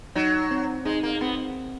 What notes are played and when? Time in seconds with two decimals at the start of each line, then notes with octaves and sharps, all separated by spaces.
0.15 F#3 D#4
0.51 C4
0.85 G#3 D#4
1.03 A#3
1.21 B3 C4